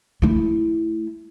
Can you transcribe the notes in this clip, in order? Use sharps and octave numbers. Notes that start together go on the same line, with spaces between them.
A3 E4